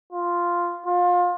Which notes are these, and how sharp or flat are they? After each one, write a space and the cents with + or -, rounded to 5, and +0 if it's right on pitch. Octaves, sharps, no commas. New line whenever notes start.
F4 -5
F4 +25